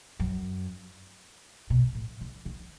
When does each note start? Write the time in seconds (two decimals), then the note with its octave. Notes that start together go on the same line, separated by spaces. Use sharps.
0.20 F#2
1.70 B2
1.95 A2
2.21 D3
2.45 D3